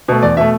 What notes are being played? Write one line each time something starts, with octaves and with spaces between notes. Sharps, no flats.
B2 A3
E2 D5
B2 A3 E5